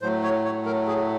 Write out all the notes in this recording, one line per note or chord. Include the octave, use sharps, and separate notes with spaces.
A2 F#3 A3 C5
C#5
C#5
A#4
G#4